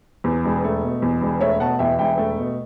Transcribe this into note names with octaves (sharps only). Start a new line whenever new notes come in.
E2
E1
A3
B2
E2
E1
A3 C#5 E5
B2 F#5 A5
E2 E5 G5
E1 E5 G5
A3
B2